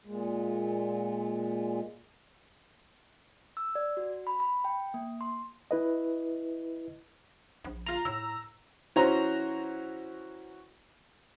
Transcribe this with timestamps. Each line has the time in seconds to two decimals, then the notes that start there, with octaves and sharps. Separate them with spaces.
0.05 A#2 G#3
3.57 E6
3.75 D5
3.97 F#4
4.27 B5
4.40 B5
4.64 G5
4.94 A#3
5.21 C6
5.71 E4 B4 D#5
7.65 A#1
7.86 F4 A#5 F7
8.05 A2 E6
8.96 E3 C#4 F#4 C5 A#5